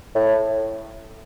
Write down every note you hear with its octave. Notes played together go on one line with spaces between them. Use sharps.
A2